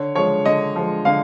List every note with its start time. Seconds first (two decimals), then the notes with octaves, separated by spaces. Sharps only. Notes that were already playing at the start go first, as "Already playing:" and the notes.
Already playing: D3 C#5
0.15 F3 G#3 C#5
0.45 D3 D#5
0.76 F3 G#3
1.05 D3 F5